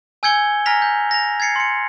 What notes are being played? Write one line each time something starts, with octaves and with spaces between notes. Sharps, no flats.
G#5 E6 G6 G#6 C#7 G7
G#5 A#5 F6 A#6 B6 F7
G6
A#6 F7
G#6 A6 C7 C#7
C6 C#7